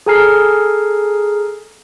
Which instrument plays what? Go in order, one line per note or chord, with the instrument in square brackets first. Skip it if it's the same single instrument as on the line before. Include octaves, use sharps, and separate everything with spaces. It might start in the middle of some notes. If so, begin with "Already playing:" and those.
[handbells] G#4 A4 G#5 A#5 F6 C7